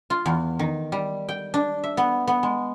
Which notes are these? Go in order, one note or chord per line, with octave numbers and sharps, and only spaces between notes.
F4
E2
D#3
G3
G5
D4
E5
B3
B3
G#3